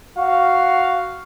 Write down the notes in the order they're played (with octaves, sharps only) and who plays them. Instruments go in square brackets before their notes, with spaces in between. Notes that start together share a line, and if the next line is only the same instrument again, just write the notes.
[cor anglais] F#4 [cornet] F5